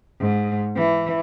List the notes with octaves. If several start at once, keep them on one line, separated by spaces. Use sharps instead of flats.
G#2
E3